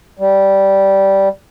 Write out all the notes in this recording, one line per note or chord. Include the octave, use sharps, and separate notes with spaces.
G3